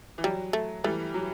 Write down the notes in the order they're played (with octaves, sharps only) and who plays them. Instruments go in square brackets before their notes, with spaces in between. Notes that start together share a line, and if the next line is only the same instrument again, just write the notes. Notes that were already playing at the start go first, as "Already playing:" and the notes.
[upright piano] E3
[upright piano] F#3 [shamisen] G3
[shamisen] A3
[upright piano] E3 G3 [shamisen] A3
[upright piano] F#3